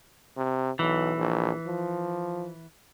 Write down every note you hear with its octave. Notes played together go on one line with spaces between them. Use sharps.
C3
B1 E3
A#1
F3